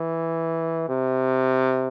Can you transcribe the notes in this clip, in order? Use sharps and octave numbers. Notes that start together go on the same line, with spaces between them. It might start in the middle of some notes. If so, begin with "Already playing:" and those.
Already playing: E3
C3